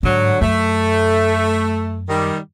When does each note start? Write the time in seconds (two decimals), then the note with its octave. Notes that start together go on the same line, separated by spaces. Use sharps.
0.03 G#2 D3 F#3
0.41 F#2 A3
2.08 D#3 G3